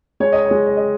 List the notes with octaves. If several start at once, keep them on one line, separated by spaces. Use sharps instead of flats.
G#3 C#5
D#5
C#5
G#3
C#5
D#5